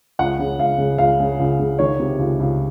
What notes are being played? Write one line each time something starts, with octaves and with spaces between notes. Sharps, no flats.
C#2 F#5
C#3
C#2 F5
C#3
C#2 F5
C#3
C#2
C#3
D#3 C#5
C3
C#2
C#2